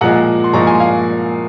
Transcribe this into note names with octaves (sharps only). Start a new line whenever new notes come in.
A#2 F3 G#3 F#5 A#5
C6
A#2 F3 G#3 A#5 C#6
G#5 C6
F5 G#5